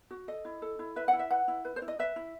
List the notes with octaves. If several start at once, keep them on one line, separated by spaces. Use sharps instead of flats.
F#4
A4 D#5
E4
A4
E4
B4 E5
F#5
E4
E5
B4 F#5
E4
B4
C5
E4
D#5
B4 E5
E4